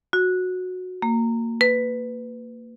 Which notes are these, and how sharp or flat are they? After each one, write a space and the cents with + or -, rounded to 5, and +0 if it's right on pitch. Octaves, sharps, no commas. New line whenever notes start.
F#4 -15
A#3 -20
B4 +10